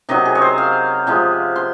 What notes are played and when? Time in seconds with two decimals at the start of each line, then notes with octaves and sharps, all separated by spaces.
0.09 C3 D#3 F#3 D#5
0.25 G#4
0.35 C#5
0.42 C5
0.58 F5
1.07 C3 F3 G#3
1.56 C6